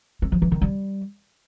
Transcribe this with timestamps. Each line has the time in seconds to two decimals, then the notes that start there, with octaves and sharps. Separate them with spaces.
0.22 C4
0.32 F3
0.42 E3
0.52 D#3
0.61 G3